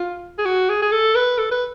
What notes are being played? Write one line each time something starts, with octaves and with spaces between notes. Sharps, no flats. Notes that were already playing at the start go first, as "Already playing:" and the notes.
Already playing: F4
G#4
F#4
G#4
G#4
A4
B4
A4
B4